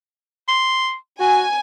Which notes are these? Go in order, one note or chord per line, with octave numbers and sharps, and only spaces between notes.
C6
F#4 G#5